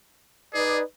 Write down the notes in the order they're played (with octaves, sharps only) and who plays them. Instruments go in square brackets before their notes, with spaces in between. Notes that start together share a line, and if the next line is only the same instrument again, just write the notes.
[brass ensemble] D#4 B4 D5 [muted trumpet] G#4